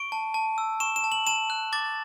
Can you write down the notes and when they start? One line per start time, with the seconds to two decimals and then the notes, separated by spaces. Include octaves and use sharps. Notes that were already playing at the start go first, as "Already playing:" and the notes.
Already playing: C#6 D7
0.12 A5
0.34 A5
0.58 E6
0.80 C#6 E7
0.96 E7
1.04 A5
1.12 F#7
1.27 A5 E7
1.50 F#6
1.72 D6 A6